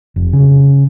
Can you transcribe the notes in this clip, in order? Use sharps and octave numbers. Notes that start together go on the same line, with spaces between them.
F1
C#3